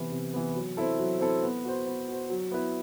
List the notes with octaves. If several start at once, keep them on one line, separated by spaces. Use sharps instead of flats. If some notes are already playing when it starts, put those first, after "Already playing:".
Already playing: C3 E3 B3
C3
E3 B3
F#3
C4 E4 A4
F#3
C4 E4 A4
B3
F#4 C5
B3
F#4 C5
F#3
B3 E4 B4